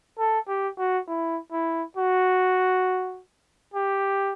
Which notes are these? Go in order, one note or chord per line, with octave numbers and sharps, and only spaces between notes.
A4
G4
F#4
E4
E4
F#4
G4